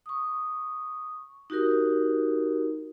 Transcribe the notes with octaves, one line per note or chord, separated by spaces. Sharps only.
C#6 D#6
D#4 F#4 G4 A#4